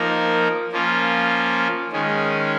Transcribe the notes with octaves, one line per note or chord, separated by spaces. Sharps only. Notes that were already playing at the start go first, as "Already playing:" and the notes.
Already playing: F3 A#3 D#4 A#4
F3 A#3 C#4 F4
D#3 G#3 C#4